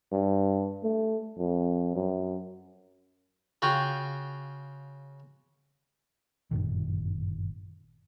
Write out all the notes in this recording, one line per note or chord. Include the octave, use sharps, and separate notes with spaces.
G2
A3
F2
F#2
C#3 F4 F#4 G5
G1 F#2 A#2 D#3